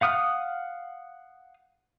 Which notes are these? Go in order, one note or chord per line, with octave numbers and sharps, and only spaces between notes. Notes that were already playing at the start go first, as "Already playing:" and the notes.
F5 F#5 D#6 F6